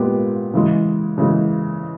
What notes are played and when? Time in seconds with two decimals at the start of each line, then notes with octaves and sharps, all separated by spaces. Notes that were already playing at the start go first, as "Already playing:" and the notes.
Already playing: A#2 G#3 B3 G4
0.53 C#3 E3 G#3
1.18 C#3 E3 G#3